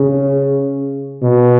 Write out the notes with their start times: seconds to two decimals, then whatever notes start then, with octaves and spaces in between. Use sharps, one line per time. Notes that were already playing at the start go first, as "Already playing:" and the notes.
Already playing: C#3
1.22 B2